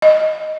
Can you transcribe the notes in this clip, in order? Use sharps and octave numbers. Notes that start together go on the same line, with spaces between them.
D#5